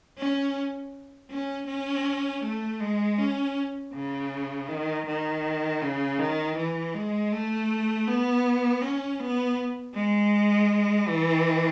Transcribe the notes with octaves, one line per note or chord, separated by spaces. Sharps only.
C#4
C#4
C#4
A3
G#3
C#4
C#3
D#3
D#3
C#3
D#3
E3
G#3
A3
B3
C#4
B3
G#3
E3